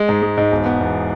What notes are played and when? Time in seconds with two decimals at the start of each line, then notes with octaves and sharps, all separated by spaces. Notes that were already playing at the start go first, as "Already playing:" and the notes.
Already playing: G#3
0.09 G#2
0.22 G#3
0.37 G#2
0.52 E1
0.65 B3
0.81 E2